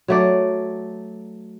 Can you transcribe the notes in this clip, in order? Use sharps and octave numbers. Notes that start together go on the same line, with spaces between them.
F#3 A3 D5